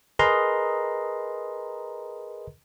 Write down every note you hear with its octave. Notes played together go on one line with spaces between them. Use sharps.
G#4 A#4 B4 D#5 A#5 C6